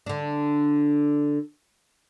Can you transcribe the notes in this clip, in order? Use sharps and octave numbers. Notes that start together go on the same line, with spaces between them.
D3 D4